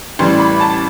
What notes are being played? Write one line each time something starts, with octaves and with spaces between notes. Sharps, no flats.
A1 A2 E3 G3 C6
B5
A5